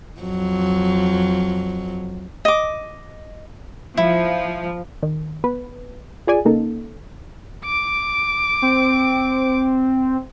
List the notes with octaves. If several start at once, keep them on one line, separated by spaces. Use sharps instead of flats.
F2 F#3
D#5 D6
F3 E4
D#3
B3 B4
F4 G#4 D5 G#5
C#3 A#3 D#4 A4
D6 D7
C4